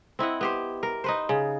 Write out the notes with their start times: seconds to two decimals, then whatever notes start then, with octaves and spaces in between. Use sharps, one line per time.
0.19 C4 E4 D#5 F#5
0.41 B3 G4 C5
0.83 A#4
1.04 D#4 B4 C5
1.29 C#3